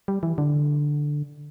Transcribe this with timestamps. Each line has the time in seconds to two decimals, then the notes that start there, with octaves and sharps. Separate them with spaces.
0.08 G3
0.23 E3
0.38 D3